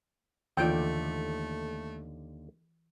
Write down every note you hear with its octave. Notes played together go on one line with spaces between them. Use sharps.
D#2 D3 E3 A3 F4 D5 G5